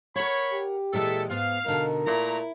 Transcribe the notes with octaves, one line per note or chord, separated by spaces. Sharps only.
A#4 C#5 F#5 B5
G4
A#2 E3 G#3 A4 E5
G#2 B3 F5
B2 D3 D#4 A#4
A#2 A3 E4 A#5